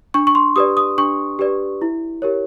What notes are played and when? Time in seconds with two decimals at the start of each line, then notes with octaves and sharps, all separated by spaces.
0.14 D4 C#6
0.27 C#6
0.35 C6
0.56 G4 B4 D5 D#6
0.77 D#6
0.98 D4 C#6
1.39 G4 B4 D5
1.82 E4
2.22 G4 A#4 C#5